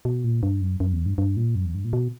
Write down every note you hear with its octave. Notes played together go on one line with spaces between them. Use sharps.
B2
A#2
G2
F#2
F#2
E2
G2
G2
A#2
F#2
E2
G2
A#2
B2